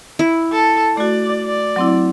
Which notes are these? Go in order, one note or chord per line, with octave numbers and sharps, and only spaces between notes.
E4
A4
A3 F#4 D5
D5
F#3 C4 E4